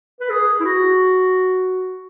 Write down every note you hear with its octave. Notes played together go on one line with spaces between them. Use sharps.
B4
G#4
E4
F#4